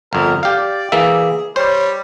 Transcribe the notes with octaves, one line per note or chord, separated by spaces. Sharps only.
G1 F2 A#4
G4 D5 F5
E3 A#3 G#4 E5
G3 C5 C#5